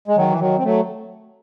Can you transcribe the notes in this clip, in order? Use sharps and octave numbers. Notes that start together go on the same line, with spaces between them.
G#3
D#3 F#3
E3
D#3 F#3
C4
F#3 A3